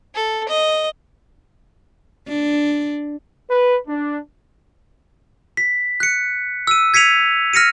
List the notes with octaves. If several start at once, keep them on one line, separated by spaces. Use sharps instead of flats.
A4
D#5
D4
B4
D4
B6
F#6 C#7
E6 D#7
G#6 B6 C#7 D#7 F7
F6 A#6 C#7 D#7